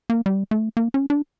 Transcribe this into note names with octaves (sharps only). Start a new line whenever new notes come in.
A#3
G3
A3
A#3
C#4
D4